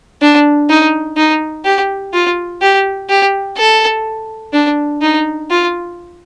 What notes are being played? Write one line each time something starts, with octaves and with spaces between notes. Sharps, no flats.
D4
D#4
D#4
G4
F4
G4
G4
A4
D4
D#4
F4